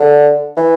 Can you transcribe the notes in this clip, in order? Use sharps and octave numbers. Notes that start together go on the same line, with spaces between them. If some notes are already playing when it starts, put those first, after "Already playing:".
Already playing: D3
E3